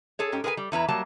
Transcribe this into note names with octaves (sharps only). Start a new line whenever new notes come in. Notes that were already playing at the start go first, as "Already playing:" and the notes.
G#4 A4 C#5
G#2 C#4 G4
G#4 A#4 B4 G5 G#5
G3
E2 E4 B4 A#5
F#3 G3 A#3 A5